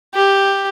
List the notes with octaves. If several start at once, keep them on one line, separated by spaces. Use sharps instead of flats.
G4